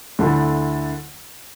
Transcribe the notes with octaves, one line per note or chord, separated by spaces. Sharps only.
D2 D3 A3 E4